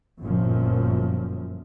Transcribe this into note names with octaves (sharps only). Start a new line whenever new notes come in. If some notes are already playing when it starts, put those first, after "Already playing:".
G1 F#2 A#2 F3